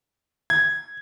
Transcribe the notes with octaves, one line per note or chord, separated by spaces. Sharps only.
G#6